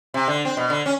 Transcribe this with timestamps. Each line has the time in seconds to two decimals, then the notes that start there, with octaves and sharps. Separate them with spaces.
0.14 C3
0.28 D3
0.45 C4
0.57 B2
0.70 D3
0.86 C#4